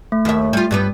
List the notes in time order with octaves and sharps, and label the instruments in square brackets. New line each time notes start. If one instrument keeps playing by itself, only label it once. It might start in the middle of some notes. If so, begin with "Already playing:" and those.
[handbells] A3
[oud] D#2 E5
G3 F4
G2 G3 B3